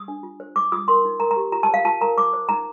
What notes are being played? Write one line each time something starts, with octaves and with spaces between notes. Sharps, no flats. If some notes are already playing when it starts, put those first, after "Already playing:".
Already playing: D#6
D4
F4
C5
C5 D6
F4 D#6
A#4 C6
D#4
A#4 A#5
A#5
G4
F4 A#5
A5
C5
F5
F4 A5
A#4 A#5
C5 D6
C5
D#4 A#5